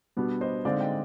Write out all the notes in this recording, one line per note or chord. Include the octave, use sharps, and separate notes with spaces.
B2 G3 B3 D4
C5 D#5
D3 G#3 C4 D#4 D5 F5
D#5 G5